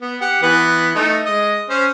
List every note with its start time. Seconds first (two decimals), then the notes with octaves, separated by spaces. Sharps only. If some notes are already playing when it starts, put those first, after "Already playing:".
0.01 B3
0.21 G4 F#5
0.43 E3 B3 B4
0.95 A3 D#4
1.26 G#3 D#5
1.70 C#4 C5